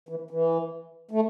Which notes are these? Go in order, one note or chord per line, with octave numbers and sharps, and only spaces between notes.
E3
E3
A3